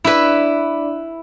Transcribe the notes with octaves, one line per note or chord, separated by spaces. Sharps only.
D4 E4 B4 D5